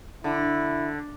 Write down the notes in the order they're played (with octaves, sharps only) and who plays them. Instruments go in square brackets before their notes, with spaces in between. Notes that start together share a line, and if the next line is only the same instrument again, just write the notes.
[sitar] D3 [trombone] E4